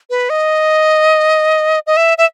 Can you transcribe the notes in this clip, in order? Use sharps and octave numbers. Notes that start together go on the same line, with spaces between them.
B4
D#5
D#5
E5
E5